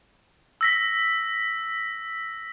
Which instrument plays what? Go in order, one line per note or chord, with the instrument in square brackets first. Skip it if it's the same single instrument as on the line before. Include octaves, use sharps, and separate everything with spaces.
[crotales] E6 A#6 B6